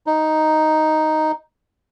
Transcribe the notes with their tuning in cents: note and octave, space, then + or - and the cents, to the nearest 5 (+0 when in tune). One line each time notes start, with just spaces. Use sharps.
D#4 +0